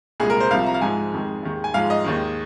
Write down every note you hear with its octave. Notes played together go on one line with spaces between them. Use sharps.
C2 A#2 G#3 G#4
A#4
C5
C2 C3 F3 F5
A#5
F5
G#2 F3 G#3 G#5
F2 D#3 G#3
D#2 D#3 G#3
G#5
G#2 F3 G#3 F5
D#5
D#2 D#3 G#3